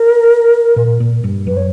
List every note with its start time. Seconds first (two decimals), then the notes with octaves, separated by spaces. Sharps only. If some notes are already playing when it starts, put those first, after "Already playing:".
Already playing: A#4
0.76 A#2
1.00 A#2
1.24 G2
1.47 F#2 B4
1.57 C#5